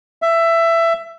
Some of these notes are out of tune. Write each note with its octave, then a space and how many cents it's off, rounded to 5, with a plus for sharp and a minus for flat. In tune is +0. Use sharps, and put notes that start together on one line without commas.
E5 +15